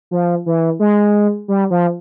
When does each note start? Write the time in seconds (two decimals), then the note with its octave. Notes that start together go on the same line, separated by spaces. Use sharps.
0.11 F3
0.46 E3
0.79 G#3
1.48 G3
1.70 F3